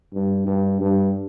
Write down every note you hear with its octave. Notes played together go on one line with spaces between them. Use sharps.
G2
G2
G2